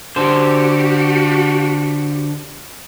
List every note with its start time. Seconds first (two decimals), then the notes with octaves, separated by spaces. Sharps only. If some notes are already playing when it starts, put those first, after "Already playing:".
0.16 D3 F#4 G4 C5